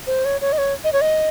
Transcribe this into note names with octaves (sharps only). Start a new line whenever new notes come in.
C5
C#5
C#5
D#5
C#5
D#5
C#5
D#5